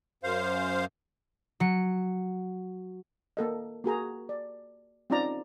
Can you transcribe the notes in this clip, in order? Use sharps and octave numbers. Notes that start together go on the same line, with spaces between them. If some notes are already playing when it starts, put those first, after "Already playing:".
F#2 C5 F5
F#3 C#7
A#3 A4 D#5
A#3 F#4 G#4 A#5
D5
C4 C#4 D#4 F4 D5 A#5